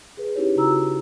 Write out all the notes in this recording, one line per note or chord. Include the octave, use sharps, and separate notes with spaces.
G#4 B4
C#4 D#4 E4 G4 C#5
C#3 E4 F#4 A#5 E6